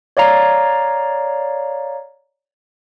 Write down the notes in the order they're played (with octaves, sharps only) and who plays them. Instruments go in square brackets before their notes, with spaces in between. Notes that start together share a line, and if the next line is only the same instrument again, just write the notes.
[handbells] C#5 D5 F5 A#5